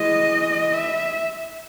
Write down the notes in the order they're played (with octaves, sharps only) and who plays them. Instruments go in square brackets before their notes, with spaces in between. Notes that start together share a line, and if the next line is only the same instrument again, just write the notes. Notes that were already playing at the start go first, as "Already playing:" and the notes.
Already playing: [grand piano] E3 G#3 [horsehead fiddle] D#5
[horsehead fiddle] E5